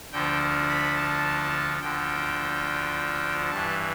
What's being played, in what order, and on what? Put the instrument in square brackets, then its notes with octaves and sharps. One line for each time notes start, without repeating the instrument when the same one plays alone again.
[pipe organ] D2 D3 F3 G5
B5
A5
D2 D3 F3 G5
G2 E3 A5